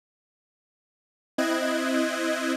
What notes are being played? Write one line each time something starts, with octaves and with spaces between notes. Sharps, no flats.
C4 E4 D#5 F#6 G#6